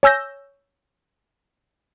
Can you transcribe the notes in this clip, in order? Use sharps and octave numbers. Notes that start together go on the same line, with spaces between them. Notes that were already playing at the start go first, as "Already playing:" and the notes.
C#5 G#5 E6 G6 A#6